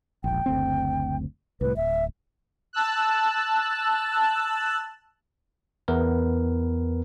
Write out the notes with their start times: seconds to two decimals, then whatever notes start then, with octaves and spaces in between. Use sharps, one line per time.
0.24 E1 A#1 G5
0.46 F#1 D2 C4
1.61 C2 A2 B4
1.76 D1 E5
2.73 A5 E6 F#6
5.88 E2 B3 A#4 B4